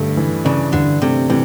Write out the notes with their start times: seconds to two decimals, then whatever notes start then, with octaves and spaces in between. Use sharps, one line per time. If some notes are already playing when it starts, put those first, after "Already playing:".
Already playing: G2 D3 A3 D4
0.17 E3
0.45 C#3 D4
0.73 G2 D3
1.02 C3 A3
1.29 C3 E3